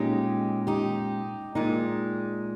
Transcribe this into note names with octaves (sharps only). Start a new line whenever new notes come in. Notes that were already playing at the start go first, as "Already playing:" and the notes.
Already playing: A#2 G#3 C#4 D#4 G4
D#4 G4
A#2 G#3 D#4